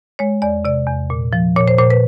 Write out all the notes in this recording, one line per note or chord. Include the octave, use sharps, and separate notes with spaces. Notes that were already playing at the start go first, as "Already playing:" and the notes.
G#3 C#5
E2 D5
C3 D5
E2
A#2
F3
A#2 C#5
C5
A#2 C5
B4